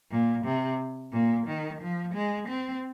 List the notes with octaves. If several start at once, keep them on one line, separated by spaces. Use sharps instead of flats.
A#2
C3
A#2
D#3
F3
G#3
C4